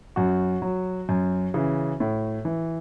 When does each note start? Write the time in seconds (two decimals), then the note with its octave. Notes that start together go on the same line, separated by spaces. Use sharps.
0.16 F#2 F#4
0.62 F#3
1.09 F#2
1.54 C#3 E3
2.00 A2
2.45 E3